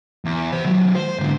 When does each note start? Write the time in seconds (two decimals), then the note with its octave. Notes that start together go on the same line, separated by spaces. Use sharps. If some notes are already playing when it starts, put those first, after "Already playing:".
0.25 E2
0.52 C5 E5
0.65 D#3 F#3
0.95 C5
1.20 G#2 D3